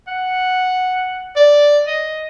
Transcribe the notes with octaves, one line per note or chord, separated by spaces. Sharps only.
F#5
D5
D#5